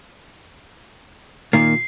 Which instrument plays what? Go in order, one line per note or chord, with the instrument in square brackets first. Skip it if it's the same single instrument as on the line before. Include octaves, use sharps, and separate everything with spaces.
[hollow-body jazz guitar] A#2 D#3 A#3 [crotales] C7